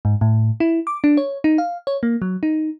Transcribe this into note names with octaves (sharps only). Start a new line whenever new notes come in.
G#2
A2
E4
D6
D4
C#5
D#4
F5
C#5
A#3
F#3
D#4